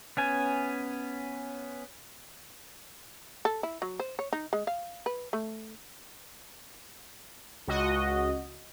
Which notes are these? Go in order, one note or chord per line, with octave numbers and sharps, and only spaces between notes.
B3 C#4 G#5
A4
E4
F#3
C5
C#5
D#4
G#3
F5
B4
A3
C#2 F#4 D#5